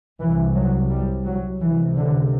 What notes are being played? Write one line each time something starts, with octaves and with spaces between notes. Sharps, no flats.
C2 C3 E3
F#3
G3
F#3
C#2 C3 E3
D3